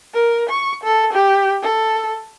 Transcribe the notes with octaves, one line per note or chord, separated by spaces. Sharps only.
A#4
C#6
A4
G4
A4